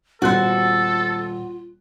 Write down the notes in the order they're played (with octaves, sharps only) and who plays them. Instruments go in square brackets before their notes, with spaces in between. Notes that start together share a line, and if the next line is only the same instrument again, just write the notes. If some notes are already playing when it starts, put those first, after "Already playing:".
[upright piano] D#1 B3 F#6 [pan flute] F4 [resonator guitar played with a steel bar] F#4 C5 [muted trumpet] A4